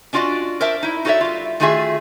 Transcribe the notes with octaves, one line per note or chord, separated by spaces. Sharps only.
C#4 D4 F4 F#4 D5 D#5
A#4 C5 D5 E5 A5
D#4 E4
D#4 F#4 A4 C#5 D5 E5
G3 F4
D#3 A3 F4 F#4 G#4 E5